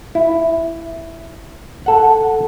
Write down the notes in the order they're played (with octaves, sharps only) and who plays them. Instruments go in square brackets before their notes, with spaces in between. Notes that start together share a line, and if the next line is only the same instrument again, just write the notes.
[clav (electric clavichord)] E4
A4 F#5